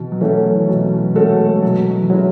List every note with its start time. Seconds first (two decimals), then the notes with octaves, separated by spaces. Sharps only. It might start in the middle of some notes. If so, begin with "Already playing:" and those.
Already playing: B2 E3
0.12 F#3
0.21 E3 A3 C#4 F#4 A4
0.62 E3
0.68 B2 F#3
1.15 G#3 A3 C#4 F#4 A4
1.63 B2 F#3
2.02 E3
2.10 F#3 G#3 C#4 E4